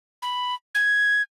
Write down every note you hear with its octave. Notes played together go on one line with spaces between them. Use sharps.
B5
G#6